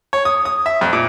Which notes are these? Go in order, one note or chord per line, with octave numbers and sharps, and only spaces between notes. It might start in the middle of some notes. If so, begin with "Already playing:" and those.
C#5
D#6
D#6
E5
F2
A#2